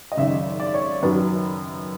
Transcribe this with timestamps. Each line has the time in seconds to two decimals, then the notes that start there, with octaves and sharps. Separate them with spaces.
0.12 D#5
0.17 G#1 F#2 C#3 E5
0.60 D5
0.74 C#5
1.03 F#2 D#3 F#3 B4